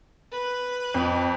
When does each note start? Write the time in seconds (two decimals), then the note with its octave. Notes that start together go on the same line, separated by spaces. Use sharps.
0.32 B4 F#6
0.94 F2